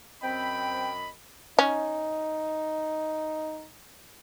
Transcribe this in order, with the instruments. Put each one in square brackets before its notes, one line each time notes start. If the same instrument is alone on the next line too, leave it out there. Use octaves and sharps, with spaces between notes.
[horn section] F#2 D#5 B5 [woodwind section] C4 G5
[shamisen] C#4 [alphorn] D#4